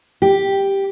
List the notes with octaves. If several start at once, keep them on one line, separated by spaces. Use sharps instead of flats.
G4